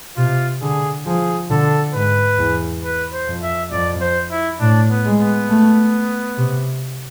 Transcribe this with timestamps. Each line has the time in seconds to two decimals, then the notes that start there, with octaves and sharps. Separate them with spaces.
0.17 C3 F4
0.61 D3 G#4
1.06 F3 G#4
1.50 D3 A4
1.94 G#2 B4
2.39 E2
2.83 B4
3.12 C5
3.28 F2
3.43 E5
3.71 F2 D5
4.01 C5
4.31 E4
4.60 A2 D4
4.90 B3
5.05 G#3
5.20 B3
5.49 A3
6.38 C3